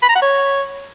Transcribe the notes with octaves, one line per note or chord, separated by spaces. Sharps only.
B5
A#5
F#5
C#5